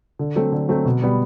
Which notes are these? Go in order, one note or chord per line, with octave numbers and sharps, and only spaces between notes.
D3
F#3 A3 C4
D3
F#3 A3 C4
B2
G3 B3